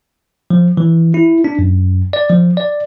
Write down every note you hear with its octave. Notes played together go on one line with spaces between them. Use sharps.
F3
E3
E4
D4
F#2
D5
F3
D5